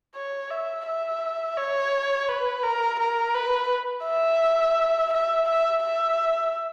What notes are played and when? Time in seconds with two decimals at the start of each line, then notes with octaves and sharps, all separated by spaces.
0.15 C#5
0.51 E5
0.86 E5
1.57 C#5
2.28 B4
2.63 A#4
2.99 A#4
3.35 B4
4.05 E5
5.13 E5
5.48 E5
5.84 E5